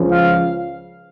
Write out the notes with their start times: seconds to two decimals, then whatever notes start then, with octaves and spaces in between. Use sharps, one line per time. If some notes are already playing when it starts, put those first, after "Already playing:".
Already playing: C#2 C#3 F3
0.11 F5